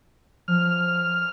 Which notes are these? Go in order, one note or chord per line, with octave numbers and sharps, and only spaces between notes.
F3 F6